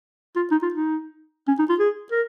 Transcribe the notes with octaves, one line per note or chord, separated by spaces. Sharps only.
F4
D#4
F4
D#4
C#4
D#4
F4
G#4
A#4